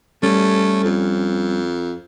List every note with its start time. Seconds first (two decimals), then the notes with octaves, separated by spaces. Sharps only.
0.23 G3 A3 C#4
0.84 F2